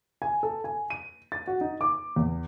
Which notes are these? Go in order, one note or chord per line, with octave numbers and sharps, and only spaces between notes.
G#5
A4
G#5
D#7
A6
F#4
D#4
D6
E2